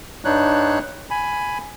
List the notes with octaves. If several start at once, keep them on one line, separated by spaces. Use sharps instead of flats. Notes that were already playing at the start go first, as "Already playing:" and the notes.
G2 G3 D4 D#4 C#5 F#6
G#5 B5